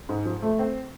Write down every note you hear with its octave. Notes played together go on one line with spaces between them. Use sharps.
G#2
F3
A3
C4